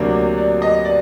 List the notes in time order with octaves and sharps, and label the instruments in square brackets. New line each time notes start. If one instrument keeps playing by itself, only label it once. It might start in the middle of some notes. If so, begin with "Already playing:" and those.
Already playing: [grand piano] D2 C3 F#3 A#3 D4 [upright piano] D5
[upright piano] D5
D5
D#5
D5